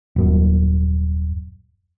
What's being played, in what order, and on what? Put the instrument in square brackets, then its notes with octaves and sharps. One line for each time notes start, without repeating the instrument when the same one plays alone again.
[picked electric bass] D#1 F#2